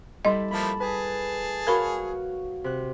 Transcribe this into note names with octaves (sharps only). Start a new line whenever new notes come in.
G3 E4 A4 D#5 C6
F3 A3 A#3 A5 B5
G#4 B4 A5
F#4 A#4 C#5 F5 B5
C3 F#6